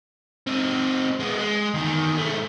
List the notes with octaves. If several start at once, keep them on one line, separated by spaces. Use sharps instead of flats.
C4 D#4
G#3 B3
G#3
E2 D#3
G#2 A3